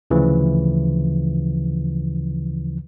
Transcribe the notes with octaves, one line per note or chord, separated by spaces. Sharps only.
D2 C#3 E3 F3